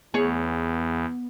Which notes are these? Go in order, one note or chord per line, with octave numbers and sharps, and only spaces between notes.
E2 B3 G#4 C#5